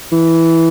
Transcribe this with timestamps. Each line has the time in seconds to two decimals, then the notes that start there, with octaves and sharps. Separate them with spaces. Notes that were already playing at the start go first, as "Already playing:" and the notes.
0.12 E3